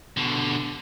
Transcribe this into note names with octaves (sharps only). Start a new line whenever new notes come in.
B2 D3